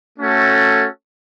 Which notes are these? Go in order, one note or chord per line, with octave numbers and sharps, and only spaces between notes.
A3 C#4 F#4 A4